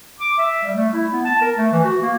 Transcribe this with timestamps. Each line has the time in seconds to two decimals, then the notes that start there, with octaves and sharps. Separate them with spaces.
0.20 D6
0.38 E5
0.63 G3
0.75 A3
0.93 E4
1.13 B3
1.25 A5
1.41 A#4
1.57 A3
1.72 E3
1.85 F#4
2.02 A#3